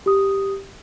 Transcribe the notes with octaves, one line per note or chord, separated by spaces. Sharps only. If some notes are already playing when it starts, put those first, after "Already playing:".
G4 D#6